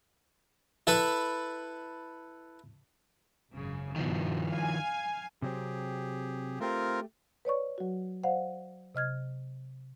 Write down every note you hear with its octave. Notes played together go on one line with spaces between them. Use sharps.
E4 A4 B4
G#1 F#2 C#3
G2 B2 D#3 F3
F5 G#5
C3 F#3 C4 G4 G#4
A3 C4 F4 G4 A#4
B4 C#5 D5 C#6
F#3 F#4
C5 D5 F5 F#5
C3 D#5 F6 G#6